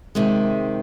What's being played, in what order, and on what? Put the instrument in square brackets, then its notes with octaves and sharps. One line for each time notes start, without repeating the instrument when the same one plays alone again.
[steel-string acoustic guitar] C3 D#3 G#3